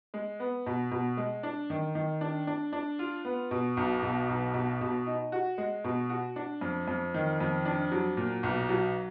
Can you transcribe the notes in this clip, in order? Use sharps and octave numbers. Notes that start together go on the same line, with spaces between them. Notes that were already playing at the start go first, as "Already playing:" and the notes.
G#3
B3
B2
B2
G#3
D4
D#3
D#3
D4
D4
D4
F4
B3
B2
B1
B2
B1
B2
B2
D#4
F#4
G#3
B2
F#4
D4
F2
F2
D#3
F2
D4
F#3
A#2
B1
F#3